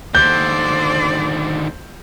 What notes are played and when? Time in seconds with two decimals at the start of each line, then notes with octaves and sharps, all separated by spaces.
0.15 D#2 D3 C5 D5 G6